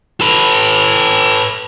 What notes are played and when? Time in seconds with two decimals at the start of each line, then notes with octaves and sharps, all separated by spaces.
0.21 A4 B4